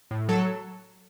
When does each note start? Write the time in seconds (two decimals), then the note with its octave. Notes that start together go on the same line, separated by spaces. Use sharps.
0.11 A2
0.29 F#3 A4